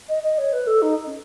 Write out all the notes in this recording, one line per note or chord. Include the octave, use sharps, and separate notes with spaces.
D#5
D#5
C#5
B4
A4
D#4
C#4